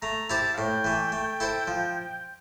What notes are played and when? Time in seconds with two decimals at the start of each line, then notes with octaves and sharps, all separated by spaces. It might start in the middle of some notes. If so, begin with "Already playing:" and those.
0.02 A3 A#5
0.30 E4 G4 C5 A5
0.54 F5
0.57 A2 G5
0.84 E3 A3
1.12 A3
1.40 E4 A4 C5
1.67 F3